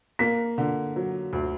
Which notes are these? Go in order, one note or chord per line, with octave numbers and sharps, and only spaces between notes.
A#3 B6
D3
F#3
D2